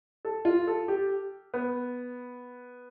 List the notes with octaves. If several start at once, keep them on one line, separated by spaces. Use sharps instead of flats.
A4
F4
A4
G4
B3